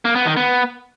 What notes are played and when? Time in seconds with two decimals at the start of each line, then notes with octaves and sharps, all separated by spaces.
0.05 A#3
0.15 B3
0.26 D#3
0.37 B3